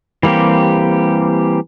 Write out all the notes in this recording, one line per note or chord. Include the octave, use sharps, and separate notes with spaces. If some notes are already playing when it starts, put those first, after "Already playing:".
E3 G3 A#3 C4 G4